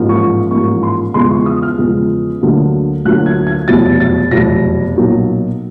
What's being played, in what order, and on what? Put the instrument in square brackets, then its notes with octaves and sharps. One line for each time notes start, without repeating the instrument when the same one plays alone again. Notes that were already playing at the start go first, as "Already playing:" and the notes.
Already playing: [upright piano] A1 G#2 F3 A#3
C#6
A1 G#2 F3 A#3 C#6
C6
E2 C#3 F3 G#3 B3 C6
C#6
D#6
F6
E2 C#3 F3 G#3 B3
D2 D3 F#3 A#3
D2 D3 F#3 A#3 F#6
G#6
G#6
F1 E2 B2 F#3 A6
A6
F1 E2 B2 F#3 A#6
B1 A#2 F#3 A#3 D#4